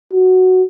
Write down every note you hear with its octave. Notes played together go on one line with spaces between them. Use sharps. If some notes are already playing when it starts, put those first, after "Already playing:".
F#4